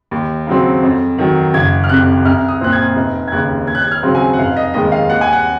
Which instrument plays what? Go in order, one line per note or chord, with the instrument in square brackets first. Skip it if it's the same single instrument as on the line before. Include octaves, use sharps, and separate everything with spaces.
[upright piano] D#2
C#3 F#3 C4
F2
D#3 F#3
F#1 G#6
F6
F2 C3 F#6
C2 F6
D#6
A#2 F3 C4 F#6
G#6
F1
G#6
D#2 C#3 F#6
D#2 G#6
F#6
G#6
F6
C#3 F#3 C4
G#5
F#5
F1 F5
D#5
D#2 D#3 G#3 D#5
F5
D#2 F#5
G#5
F#5